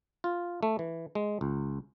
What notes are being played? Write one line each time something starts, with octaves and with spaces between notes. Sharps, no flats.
F4
A3
E3
G#3
C#2